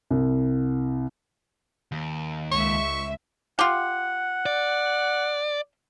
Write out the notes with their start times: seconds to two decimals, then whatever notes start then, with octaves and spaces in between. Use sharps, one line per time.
0.11 C2
1.92 D#2
2.51 C#2 E5 C#6
3.59 F4 G4 F#5
4.46 D5